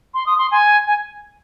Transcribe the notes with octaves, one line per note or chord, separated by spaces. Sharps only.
C6
D#6
C6
G#5
G#5